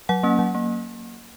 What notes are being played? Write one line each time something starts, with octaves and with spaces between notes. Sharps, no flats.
F#3 F#5
A#3 C#4
F#3
A#3